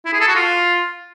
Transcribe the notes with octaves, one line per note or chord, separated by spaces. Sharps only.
E4
G#4
A4
F#4
F4